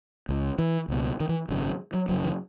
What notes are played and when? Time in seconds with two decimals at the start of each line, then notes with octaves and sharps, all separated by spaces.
0.29 C#2 C#3
0.59 E3
0.88 C#2 B2
1.20 D#3
1.29 E3
1.49 G#1 F#2 C#3
1.94 F#3
2.09 F#1 F#2 C#3 F#3
2.24 E3